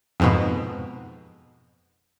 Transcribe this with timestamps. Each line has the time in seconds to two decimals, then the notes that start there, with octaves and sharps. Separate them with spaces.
0.20 F2 G#2 B2